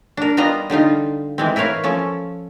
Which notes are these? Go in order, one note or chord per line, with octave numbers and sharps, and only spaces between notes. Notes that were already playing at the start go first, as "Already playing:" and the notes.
D4 A#4
G3 B3 F4 D#5 A#5
D3 G3 D#4 F4
E3 G#3 C4
E4 A#4 B4 C#5 F5
F3 C#4 A4